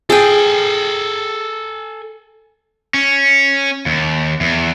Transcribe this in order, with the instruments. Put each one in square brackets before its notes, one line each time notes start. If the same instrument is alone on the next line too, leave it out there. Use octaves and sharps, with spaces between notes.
[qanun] G#4 G5 [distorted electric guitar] A4 G#5
[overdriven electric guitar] C#4
D#2
E2